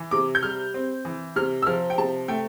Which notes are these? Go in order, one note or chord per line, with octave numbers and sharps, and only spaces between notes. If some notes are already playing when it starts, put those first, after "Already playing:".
Already playing: E3
C3 D6
G6
G3 F6
C4
E3
C3 F6
E6
F3 F6
G5
C3 A5
A3 G5